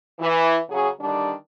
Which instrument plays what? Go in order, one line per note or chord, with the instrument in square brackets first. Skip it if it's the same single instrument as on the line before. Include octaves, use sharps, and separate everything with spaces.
[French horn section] E3
C#3 F#3 C#4 G#4
D3 D#3 G3 D4